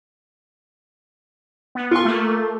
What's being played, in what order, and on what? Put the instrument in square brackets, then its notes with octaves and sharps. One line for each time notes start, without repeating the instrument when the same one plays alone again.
[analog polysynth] B3
[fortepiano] F4 C6 [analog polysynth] C#6
[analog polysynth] A3 A#3